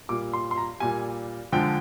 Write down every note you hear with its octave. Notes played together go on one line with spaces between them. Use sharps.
A#2 G3 D6
C6
C6
A#5
A#2 G3 G#5
D3 F3 G#3 G5